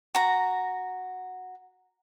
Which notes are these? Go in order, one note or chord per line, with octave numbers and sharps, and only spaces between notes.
F#4 A#5